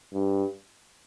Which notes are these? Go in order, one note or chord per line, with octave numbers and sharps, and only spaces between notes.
G2